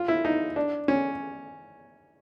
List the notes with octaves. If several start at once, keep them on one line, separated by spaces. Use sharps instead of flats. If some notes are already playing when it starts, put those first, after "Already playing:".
Already playing: F4
E4
D#4
D4
C#4